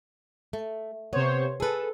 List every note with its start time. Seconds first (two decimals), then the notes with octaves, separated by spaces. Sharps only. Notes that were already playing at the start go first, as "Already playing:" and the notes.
0.53 A3
1.13 C3 B3 C5 C#5
1.60 G#4 A4 B4